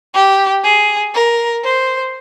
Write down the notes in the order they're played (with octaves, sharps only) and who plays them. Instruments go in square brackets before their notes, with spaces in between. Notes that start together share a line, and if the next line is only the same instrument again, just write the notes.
[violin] G4
G#4
A#4
C5